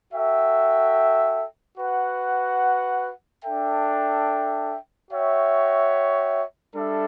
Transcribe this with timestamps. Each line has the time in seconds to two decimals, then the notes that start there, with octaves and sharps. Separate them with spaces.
0.11 F#4 A4 E5 G5
1.77 F#4 B4 F#5
3.43 D4 A4 E5 G5
5.10 F#4 C#5 E5 G5
6.75 G3 D4 A4 E5